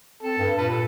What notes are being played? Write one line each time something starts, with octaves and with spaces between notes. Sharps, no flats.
C4 A4
G2
A#2 B4 A5
A4